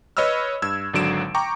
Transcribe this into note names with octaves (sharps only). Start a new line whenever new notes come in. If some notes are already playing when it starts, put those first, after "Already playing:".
B4 C#5 D#5 B5 E6 F6
G2 E6 G#6
G#1 D3 F#3 D7 E7
G5 A#5 C#6 D6